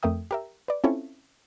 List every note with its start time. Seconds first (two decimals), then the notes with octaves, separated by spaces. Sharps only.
0.03 F2 A3 A#4 E5 G5 D#6
0.31 G4 A#4 E5
0.68 B4 D5
0.84 C4 C#4 E4 F4 A4 C#5